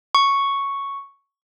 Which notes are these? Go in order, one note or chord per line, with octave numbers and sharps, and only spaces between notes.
C#6